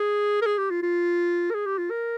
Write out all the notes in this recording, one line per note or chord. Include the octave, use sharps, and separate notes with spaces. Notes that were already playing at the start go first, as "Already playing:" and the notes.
Already playing: G#4
A#4
G#4
G4
F4
F4
A#4
G#4
G4
F4
A#4